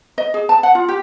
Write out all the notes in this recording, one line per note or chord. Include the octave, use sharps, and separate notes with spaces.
D#5
G#4
A5
F#5
F4
G4